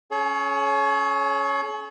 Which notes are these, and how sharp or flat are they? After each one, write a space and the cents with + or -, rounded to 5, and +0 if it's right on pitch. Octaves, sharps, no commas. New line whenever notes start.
C#4 +0 G#4 +45 C#5 +5